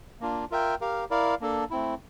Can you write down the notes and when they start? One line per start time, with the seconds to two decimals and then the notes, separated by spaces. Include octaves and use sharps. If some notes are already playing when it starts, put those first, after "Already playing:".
0.20 A#3 D4 F4
0.51 F4 A#4 E5 G5
0.81 G4 A#4 F5
1.11 E4 A#4 D5 F5
1.41 A#3 D4 A4
1.70 A3 C4 E4